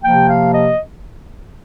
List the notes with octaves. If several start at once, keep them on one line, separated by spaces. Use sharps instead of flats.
C3 F3 A#3 G5
F5
D#5